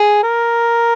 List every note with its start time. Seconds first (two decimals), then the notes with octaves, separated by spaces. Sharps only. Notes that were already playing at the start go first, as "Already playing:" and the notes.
Already playing: G#4
0.23 A#4